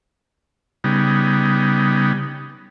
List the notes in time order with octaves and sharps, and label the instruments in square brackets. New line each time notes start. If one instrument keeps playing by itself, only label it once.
[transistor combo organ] C#3 G3 B3 D#4